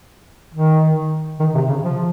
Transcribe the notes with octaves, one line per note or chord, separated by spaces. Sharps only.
D#3
D#3
C3
C#3
F3